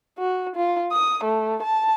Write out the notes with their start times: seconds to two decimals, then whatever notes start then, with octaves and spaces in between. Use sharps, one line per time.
0.19 F#4
0.56 F4
0.92 D#6
1.24 A3
1.63 A5